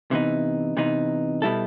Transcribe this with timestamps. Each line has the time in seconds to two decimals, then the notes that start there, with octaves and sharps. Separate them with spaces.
0.11 C3 E3 B3 D#4
0.77 C3 E3 B3 D#4
1.42 B2 G3 B3 E4 A4